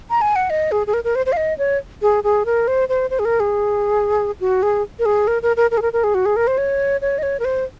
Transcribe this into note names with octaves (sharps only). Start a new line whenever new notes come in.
A#5
G#5
F#5
D#5
G#4
G#4
A#4
A#4
C5
C5
F5
D#5
C#5
G#4
G#4
A#4
C5
C5
C5
G#4
A#4
G#4
F#4
G#4
A#4
G#4
A#4
A#4
A#4
A#4
G#4
A#4
A#4
G#4
F#4
G#4
A#4
C5
C#5
C#5
D#5
C#5
A#4
C5